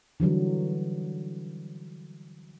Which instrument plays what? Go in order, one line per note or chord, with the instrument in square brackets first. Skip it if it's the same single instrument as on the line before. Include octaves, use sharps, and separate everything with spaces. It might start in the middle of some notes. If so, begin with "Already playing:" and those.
[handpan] D3 E3 F#3 G3